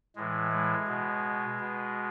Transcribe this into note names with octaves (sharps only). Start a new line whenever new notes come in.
A2 E3 G#3
G#3
B2
B2